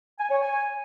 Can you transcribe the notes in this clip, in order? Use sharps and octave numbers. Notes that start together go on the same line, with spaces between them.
G#5
C#5
G#5